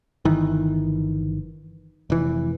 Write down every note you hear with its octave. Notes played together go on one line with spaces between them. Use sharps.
G1 D#3 E3
F1 E3